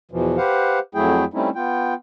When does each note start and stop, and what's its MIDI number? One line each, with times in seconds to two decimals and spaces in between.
0.11 0.37 40
0.11 0.37 47
0.11 0.37 52
0.11 0.37 53
0.37 0.79 67
0.37 0.79 71
0.37 0.79 72
0.37 0.79 77
0.37 0.79 78
0.95 1.25 41
0.95 1.25 54
0.95 1.25 57
0.95 1.25 64
0.95 1.25 68
0.95 1.25 79
1.34 1.50 55
1.34 1.50 57
1.34 1.50 60
1.34 1.50 61
1.34 1.50 63
1.34 1.50 64
1.55 1.94 59
1.55 1.94 65
1.55 1.94 79